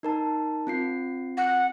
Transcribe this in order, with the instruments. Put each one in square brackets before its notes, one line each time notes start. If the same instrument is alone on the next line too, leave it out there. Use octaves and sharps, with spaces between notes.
[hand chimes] D#4 A#4 A5
C4 F4 C7
[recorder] F#5